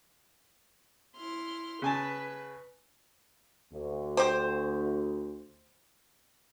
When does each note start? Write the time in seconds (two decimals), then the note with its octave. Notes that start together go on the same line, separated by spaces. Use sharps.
1.15 E4 C6 F6
1.82 C#3 B4 G#5 A5
3.73 D2
4.17 G4 C5